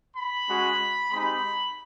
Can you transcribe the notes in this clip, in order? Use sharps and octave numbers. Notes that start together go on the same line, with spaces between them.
B5
G#3 C#4 F#4
G#3 C4 D#4 G4 B5